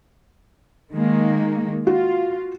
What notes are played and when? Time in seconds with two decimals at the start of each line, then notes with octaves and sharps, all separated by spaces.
0.93 D#3 G#3 A#3
1.87 F4 F#4